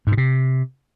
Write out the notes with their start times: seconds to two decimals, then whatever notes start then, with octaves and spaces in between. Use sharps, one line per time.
0.07 G#2
0.12 B2
0.17 C3